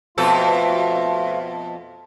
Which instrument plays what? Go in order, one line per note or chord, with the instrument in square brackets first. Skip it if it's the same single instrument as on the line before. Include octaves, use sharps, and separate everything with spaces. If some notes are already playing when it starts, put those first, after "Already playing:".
[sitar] F2 B2 A4 [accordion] A3 F4